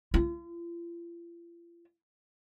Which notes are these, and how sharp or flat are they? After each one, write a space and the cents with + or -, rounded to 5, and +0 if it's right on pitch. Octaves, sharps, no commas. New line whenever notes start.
F4 -45